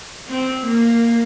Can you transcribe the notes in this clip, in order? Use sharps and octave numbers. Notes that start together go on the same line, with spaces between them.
C4
A#3